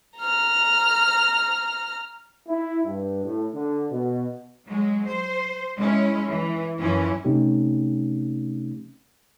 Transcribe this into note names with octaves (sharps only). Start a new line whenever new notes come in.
A#5 F6
E4
G2
A2
D3
B2
F#3 G#3
C5
G#3 C#4 E4
E3
F#2 E3 F3 C#4 E4
C3 A3 C4 C#4 D#4 G4